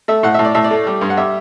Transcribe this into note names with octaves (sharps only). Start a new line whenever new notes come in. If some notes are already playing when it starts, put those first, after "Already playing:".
A3 E5
A2 F#5
E5
A2
D5
A2 E5
D5
A3
G3
G2
F#5
G3 E5